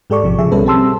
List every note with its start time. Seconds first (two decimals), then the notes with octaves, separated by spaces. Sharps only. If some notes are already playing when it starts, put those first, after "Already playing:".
0.10 G#2 G#3 G4 A4 D5 C#6
0.23 A1 C3 F3
0.38 C#3 F3 G#4 E5
0.52 B1 B2 G3 C#4 A4 B4
0.66 C4 G4 A5 C6 E6